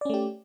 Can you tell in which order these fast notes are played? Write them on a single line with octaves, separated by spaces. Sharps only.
D5 C#4 A3 G4